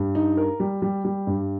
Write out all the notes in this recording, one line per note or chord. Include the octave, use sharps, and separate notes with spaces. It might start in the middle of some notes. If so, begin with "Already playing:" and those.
Already playing: G2
D#4
A#4
G3
G3
G3
G2